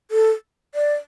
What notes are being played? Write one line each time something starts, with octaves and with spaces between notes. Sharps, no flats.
A4
D5